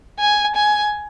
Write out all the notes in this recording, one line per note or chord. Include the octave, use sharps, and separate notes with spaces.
G#5
G#5